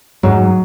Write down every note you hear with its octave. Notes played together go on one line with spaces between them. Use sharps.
G#2 F#3